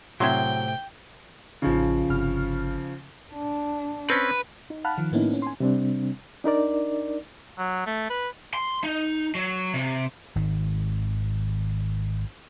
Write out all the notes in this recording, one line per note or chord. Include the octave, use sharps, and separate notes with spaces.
A2 C3 F#3 E4 G#4 G5 C6
A1 C#3 F3 D#4
G1 C3 F6
D4
C4 C#4 B4
D#4
F5 F#5 A5 B5 F6 F#6
D#3 F3
A2 A#3 B3 C#4 D#4 E4
C4 C#4
G#5 C6
C3 G3 C4 D4
D4 D#4 A#4 D5
F#3
A3
B4
C6
D#4
F#3
C3
G#1 D#3